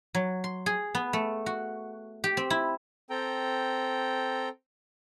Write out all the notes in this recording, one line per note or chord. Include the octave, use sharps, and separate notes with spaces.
F#3
C6
G#4
B3
A3
F#4
G4
C4
E4
C4 A4 G5 A#5